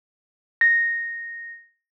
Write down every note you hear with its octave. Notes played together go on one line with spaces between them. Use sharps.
A#6